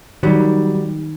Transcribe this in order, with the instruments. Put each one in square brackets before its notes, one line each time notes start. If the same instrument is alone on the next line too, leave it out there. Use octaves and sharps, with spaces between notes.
[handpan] D#3 [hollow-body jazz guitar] F#3 G3